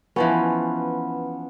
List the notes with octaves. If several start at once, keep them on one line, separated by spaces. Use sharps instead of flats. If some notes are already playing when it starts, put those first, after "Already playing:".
E3 F3 B3 C#4